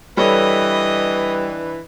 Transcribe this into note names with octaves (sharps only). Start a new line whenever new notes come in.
E3 G3 D4 A4 B4 C#5 D#5